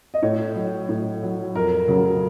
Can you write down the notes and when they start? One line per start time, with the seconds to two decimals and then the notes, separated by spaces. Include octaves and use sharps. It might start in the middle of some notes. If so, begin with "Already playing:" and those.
0.14 D#5
0.22 A2 C#5
0.55 F#3
0.89 A2
1.23 F#3
1.55 F2 A#4
1.88 C#3 F#3